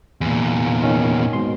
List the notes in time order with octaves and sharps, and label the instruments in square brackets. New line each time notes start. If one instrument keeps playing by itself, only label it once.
[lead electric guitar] E2 A#2
[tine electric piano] D#3 C#4
G#2 B2 C6